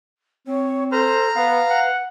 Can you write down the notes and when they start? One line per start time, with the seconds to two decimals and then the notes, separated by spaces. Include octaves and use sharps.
0.48 C4 C#5
0.92 A4 C5 A#5 F6
1.36 B3 B4 F5
1.70 F#5